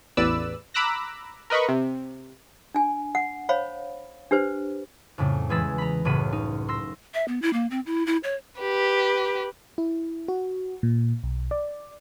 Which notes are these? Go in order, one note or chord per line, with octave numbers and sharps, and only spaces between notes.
A1 E2 B4 D5 E6
A#5 B5 D6 E6 F#6 A#6
A#4 B4 D#5 B5 C#6
C3
D4 G#5
F#5
C5 C#5 F5 B5
D4 G4 B4 C5
F2 A2 C#3 G3
E2 E3 G#3 B5 E6 A6
A#5 B5
F#1 C#2 A2 F#3 B5 D#7
D#4
C6 E6 A#6
E5
B3
E4
A#3
C4
E4
E4
C#5
G4 B4
E4
F#4
A#2
B1
D5